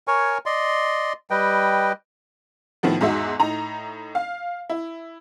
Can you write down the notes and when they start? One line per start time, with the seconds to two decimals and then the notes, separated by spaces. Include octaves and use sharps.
0.08 A#4 C#5 G#5 C#6
0.46 D5 D#5 C6
1.30 G3 B4 D#5 G5
2.83 A2 D#3 F3 B3
3.01 E2 G#2 D#4 F#4 E5
3.40 A2 D#4 A#5
4.15 F5
4.70 E4